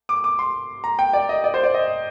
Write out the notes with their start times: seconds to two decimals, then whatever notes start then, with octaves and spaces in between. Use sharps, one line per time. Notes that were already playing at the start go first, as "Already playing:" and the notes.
0.09 D6
0.24 D6
0.39 C6
0.84 A#5
0.99 G5
1.13 D5
1.29 D#5
1.44 D5
1.54 C5
1.64 D5
1.74 D#5